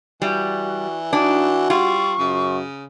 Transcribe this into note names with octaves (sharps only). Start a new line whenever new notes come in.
E3 G3 F#4
D4 D#4 F#4
G3 F4 C#6
F#2 C#3